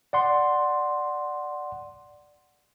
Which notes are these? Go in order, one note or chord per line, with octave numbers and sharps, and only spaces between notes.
D5 F#5 C6